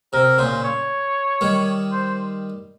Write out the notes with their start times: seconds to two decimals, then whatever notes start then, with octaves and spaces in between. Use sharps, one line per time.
0.13 C3 A#4
0.38 A#2 C#3 C5
0.64 C#5
1.41 D#3 G3
1.92 C5